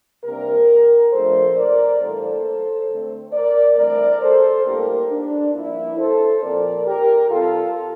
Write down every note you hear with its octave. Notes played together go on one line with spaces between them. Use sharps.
C3 G3 A#3 D4 G4 A#4
A#2 F3 A3 D4 A4 C5
A#4 D5
A2 E3 G3 A#3 D4 A4 C5
D3 A3 C4
A#4 D5
G2 E3 A3 C4 A#4 D5
A4 C5
A2 G3 A#3 D4 G4 A#4
D4
G2 F3 A#3 D4 E4
A4 C5
A#2 F3 C4 A#4 D5
G4 A#4
C3 G3 C4 F4 A4